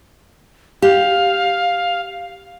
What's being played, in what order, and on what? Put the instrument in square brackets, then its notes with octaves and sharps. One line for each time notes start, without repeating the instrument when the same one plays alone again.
[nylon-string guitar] G4 [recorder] F5